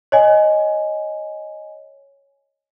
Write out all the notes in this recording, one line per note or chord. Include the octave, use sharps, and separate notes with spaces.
C#5 D#5 G#5